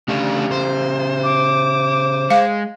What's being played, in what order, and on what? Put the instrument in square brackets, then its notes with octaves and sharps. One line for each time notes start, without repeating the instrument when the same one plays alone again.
[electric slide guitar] C#3 G4 F5 [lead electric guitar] A3 D4
[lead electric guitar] C5
[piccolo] D6
[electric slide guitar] G#3 [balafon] F5